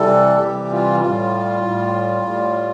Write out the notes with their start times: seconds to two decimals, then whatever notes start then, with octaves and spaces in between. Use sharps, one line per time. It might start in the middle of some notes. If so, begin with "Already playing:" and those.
Already playing: C3 E3 G3 A4
0.40 C3 E3 G3 G4
0.71 F4
1.00 A2 G3 F4
1.62 A2 G3
2.23 A2 G3